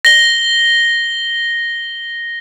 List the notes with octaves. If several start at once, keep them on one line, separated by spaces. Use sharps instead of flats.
A#6 G7